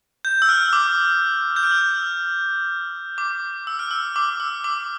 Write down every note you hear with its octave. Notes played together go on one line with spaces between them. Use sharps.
G6
E6
F6
D6
G6
F6
E6
D6
E6
F6
E6
D6
E6
D6